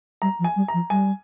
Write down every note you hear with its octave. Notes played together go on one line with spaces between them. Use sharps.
G3 A#5
F3
G#5
G3
A#5
F3
G3 G#5